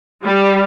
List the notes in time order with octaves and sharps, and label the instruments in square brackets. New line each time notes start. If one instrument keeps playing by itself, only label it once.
[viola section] G3